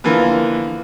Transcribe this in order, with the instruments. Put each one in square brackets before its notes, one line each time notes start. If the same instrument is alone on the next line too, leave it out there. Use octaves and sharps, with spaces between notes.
[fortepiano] D3 E3 F3 A#3 B3